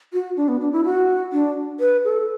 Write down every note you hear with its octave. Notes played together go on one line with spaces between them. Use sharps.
F#4
D4
B3
D4
E4
F#4
D4
B4
A4